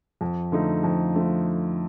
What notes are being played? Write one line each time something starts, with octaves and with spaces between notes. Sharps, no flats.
F2
D3 F3 A3 D#4
F2
D3 F3 A3 D#4